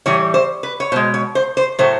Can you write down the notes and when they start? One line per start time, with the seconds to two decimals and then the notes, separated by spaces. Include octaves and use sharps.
0.06 A2 E3 G3 C#5
0.34 C5
0.63 B4
0.80 C#5
0.92 B2 G#3 C5
1.14 C#5
1.35 C5
1.57 C5
1.79 A2 F#3 A3 C5